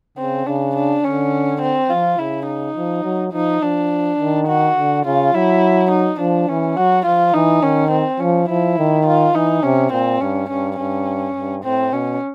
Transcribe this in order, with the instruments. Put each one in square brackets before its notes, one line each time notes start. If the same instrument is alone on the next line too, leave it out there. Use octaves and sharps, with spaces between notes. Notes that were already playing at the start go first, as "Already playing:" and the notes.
[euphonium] C#3 [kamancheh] C4
[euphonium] C#3 [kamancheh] D4
[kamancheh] D4
[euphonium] D3 [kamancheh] C#4
[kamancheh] C4
[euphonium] F3 [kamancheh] F4
[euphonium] C#3 [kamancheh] E4
[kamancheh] D#4
[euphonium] F3
F#3
[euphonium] F3 [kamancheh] D#4
[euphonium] F3 [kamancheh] D4
[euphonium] D#3
[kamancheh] F#4
[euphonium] D3
[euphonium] C#3 [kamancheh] F4
[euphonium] F#3 [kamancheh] E4
[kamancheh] D#4
[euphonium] F3 [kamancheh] D4
[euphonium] E3 [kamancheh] C#4
[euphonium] F#3 [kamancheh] F#4
[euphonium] F3 [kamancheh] F4
[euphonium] E3 [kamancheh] D#4
[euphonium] D#3 [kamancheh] C#4
[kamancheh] C4
[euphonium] F3 [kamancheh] C#4
[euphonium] F3 [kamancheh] E4
[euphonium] D#3
[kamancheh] F4
[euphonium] E3 [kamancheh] D#4
[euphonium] C3 [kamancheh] C#4
[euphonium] A#2 [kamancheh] C4
[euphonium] G2 [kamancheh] C#4
[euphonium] G2 [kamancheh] C#4
[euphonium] G2 [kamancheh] C#4
[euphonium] G2
[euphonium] A2 [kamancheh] C4
[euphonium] B2 [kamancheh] C#4